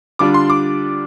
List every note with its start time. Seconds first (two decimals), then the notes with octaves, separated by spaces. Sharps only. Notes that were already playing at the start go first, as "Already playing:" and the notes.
0.19 D3 G3 D4 F4 D6
0.34 C6
0.50 D6